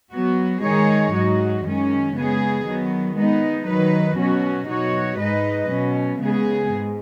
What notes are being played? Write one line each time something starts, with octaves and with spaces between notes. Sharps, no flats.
F#3 B3 F#4
D#3 G#3 D#4 G#4 C#5
G#2 F#3 D#4 F#4
F#2 D#3 G#3 C#4
C#3 G#3 B3 G#4
D#3 F#3 B3
G#3 B3 D#4
D#3 F#3 D#4 B4
B2 F#3 C#4 F#4
B2 F#3 D#4 F#4 C#5
G#2 G#3 D#4 B4 D#5
B2 F#3 C#4
C#3 G#3 B3 G#4
G#2